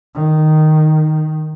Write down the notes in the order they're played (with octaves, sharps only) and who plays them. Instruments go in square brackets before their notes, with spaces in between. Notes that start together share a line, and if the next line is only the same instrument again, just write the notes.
[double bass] D#3